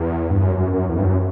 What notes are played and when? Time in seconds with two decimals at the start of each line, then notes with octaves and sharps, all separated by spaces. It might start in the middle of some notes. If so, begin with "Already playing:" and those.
Already playing: E2
0.30 G2
0.42 F#2
0.57 F#2
0.74 F#2
0.89 E2
0.98 G2
1.05 F#2